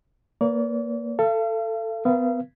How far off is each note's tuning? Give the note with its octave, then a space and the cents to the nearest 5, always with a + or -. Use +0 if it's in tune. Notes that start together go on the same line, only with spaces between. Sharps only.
A#3 +0 B4 +5 D5 -40
A4 +15 F5 -40
B3 +30 A#4 +45 F5 -30